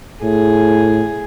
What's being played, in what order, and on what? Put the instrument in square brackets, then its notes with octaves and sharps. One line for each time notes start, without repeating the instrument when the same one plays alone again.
[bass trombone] A2 [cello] G#4